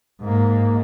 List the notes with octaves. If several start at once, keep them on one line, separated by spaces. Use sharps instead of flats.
G#2 A#3